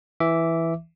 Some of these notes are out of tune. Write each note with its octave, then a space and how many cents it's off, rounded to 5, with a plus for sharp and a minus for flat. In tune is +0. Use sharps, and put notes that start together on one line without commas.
E3 +0 E5 +0 D6 -15